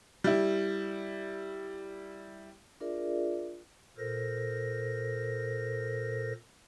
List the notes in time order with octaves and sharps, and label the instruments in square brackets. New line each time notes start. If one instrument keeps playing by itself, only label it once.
[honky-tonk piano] G3 E4
[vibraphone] D4 F4 G#4 A#4 D5 E5
[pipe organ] A#2 A4 A#4 C5 A#6